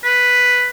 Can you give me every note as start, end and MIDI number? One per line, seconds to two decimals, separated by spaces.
0.04 0.67 71